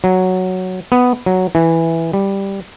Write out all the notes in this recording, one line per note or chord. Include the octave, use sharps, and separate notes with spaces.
F#3
B3
F#3
E3
G3